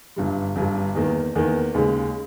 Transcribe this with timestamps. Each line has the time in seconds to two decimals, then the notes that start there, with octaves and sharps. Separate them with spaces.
0.16 G1 G2 G3
0.56 G1 G2 G3
0.95 E2 D#3 A#3
1.35 E2 D#3 A#3
1.74 D#2 C#3 G#3